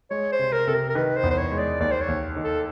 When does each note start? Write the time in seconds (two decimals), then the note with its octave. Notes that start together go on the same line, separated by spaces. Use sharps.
0.10 G#3 C#5
0.32 C5
0.39 C3
0.53 A#4
0.67 C3 A4
0.74 A#4
0.90 A#4
0.95 D#3 B4
1.17 C5
1.23 E2
1.31 C5
1.37 C#5
1.52 G#3
1.59 D5
1.80 D#2 D5
1.92 C5
2.01 C#5
2.08 D#2
2.36 D#3
2.44 A4